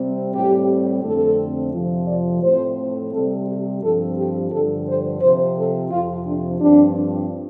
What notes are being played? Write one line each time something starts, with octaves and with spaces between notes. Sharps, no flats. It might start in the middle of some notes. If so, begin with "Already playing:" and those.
Already playing: C3 G3 C4
A2 G3 C4 G4
F2 D3 A3 C4 A4
F2 C3 F3
D5
A2 A3 C4 C5
C3 G3 C4 A4
G4
G2 F3 C4 A4
G4
G2 D3 F3 A4
C5
C3 F3 C4 C5
A4
F2 C3 F3 F4
D4
G2 F3 C4 D4